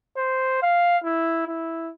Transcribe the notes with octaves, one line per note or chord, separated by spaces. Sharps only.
C5
F5
E4
E4